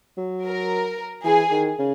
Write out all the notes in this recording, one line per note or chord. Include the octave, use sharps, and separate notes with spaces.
F#3
A#4
E3 G#4
D#3
C#3